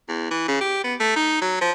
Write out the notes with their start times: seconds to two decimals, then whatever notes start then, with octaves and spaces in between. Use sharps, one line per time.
0.09 E2
0.31 E3
0.48 C#3
0.61 G4
0.84 B3
1.00 A3
1.16 D#4
1.41 F#3
1.61 F3